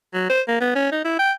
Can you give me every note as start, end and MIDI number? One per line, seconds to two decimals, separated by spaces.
0.14 0.26 54
0.30 0.42 72
0.48 0.60 58
0.61 0.73 59
0.75 0.92 61
0.92 1.04 63
1.05 1.19 64
1.19 1.32 79